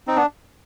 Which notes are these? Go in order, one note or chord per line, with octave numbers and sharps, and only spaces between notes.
C4 D#4
B3 D4